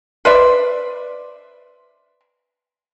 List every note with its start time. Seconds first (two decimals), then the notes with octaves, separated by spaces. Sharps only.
0.25 B4 C5 D5 E5